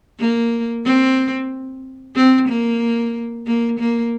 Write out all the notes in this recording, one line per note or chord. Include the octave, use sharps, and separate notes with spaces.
A#3
C4
C4
A#3
A#3
A#3